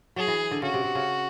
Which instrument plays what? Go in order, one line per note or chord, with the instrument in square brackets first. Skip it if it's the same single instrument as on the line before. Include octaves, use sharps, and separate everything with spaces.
[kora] F#3 [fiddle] G#4
[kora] E3
D3
[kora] C#3 [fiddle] F#4
[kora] C3
C3
C#3